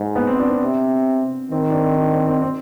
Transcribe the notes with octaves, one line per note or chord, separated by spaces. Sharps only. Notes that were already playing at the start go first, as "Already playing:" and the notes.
Already playing: G#2
B3
C4
D4
C4
C3
D#3 C4
D4
C4
D4
C4
C4
C4